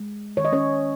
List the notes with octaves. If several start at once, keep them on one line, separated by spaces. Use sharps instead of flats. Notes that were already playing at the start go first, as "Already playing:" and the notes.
Already playing: G#3
D#3 C#5
D#5
C#4 C#5